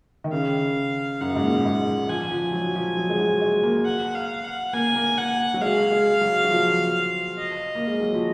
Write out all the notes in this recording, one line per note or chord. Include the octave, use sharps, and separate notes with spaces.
D#3
C#3 F5
F#2 F#5
G#2
A#2
G#2
F3 G#5
F3
F#3
F3
F#3
G#3
F#3
G#3
A#3
F#5
F5
F#5
A#3 G#5
A#3
F#5
F#3
G#3 F5
G#3
F#3
F#3
F3
D#5
A#3
G#3
F#3
F3